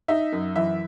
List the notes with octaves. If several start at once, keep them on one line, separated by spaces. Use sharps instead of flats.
D#4 E5
F#2
E3 E5